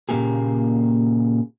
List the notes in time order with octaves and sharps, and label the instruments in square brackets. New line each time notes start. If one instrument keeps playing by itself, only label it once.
[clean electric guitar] A#2 C#3 F#3 A#3 G4 G#4